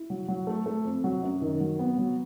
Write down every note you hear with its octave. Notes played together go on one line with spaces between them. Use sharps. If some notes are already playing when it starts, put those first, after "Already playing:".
Already playing: E4
F#3
F#3
A3
A3
F2
F#3
F#2
D#3
F#3
B3
F#3